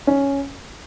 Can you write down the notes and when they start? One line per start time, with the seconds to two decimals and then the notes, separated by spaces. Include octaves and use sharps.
0.07 C#4